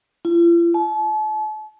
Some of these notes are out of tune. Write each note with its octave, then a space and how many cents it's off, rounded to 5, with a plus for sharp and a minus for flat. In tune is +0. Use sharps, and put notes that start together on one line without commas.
F4 -45
A5 -40